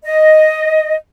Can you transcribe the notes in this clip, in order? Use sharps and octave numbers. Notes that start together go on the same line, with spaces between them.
D#5